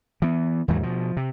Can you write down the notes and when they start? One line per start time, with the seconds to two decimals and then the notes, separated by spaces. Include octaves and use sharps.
0.22 E3 B3
0.68 D#2 G#2 E3 F#3
0.83 B2 F3
1.17 C3